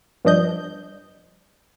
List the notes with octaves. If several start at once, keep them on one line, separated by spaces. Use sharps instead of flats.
G2 F3 D4 D#5 G6